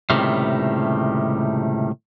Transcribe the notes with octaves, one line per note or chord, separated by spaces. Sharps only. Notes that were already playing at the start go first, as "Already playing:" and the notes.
C#2 A2 C3 D#3 G3